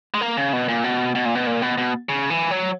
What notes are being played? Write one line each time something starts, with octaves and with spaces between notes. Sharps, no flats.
G#3
A#3
C#3
B2
A#2
B2
B2
A#2
B2
A#2
B2
B2
C#3
E3
F#3